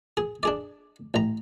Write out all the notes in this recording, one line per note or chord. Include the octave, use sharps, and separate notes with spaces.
G#4
D4 G#4 D5
A1 A#5